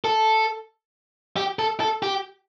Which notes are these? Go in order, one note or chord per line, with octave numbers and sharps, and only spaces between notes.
A4
G4
A4
A4
G4